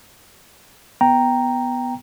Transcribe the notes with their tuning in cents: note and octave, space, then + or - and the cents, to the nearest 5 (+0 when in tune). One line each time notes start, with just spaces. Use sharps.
B3 +0 G5 +0 A#5 +0